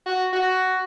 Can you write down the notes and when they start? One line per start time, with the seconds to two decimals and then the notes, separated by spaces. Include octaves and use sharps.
0.06 F#4
0.33 F#4